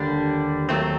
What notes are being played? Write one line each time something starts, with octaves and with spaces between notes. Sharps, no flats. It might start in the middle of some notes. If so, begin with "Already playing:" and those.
Already playing: D#2 D3 G3 D4
D#2 D#3 F#3 A3 C4